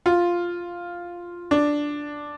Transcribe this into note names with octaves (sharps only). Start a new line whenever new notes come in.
F4
D4